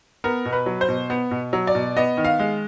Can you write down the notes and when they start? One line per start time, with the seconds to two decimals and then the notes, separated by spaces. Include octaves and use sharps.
0.24 B3 A#4
0.45 B2
0.53 B4
0.66 F#3
0.81 C5
0.89 B2
1.10 B3
1.31 B2
1.53 F#3
1.67 D5
1.75 B2
1.96 B3 D#5
2.17 D#3
2.25 F5
2.39 G#3